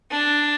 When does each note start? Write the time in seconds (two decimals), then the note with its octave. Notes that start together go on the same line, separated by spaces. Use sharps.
0.11 D4